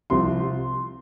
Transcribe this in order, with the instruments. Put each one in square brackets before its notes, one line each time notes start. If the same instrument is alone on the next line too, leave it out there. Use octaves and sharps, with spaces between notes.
[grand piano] C2 C3 F3 C6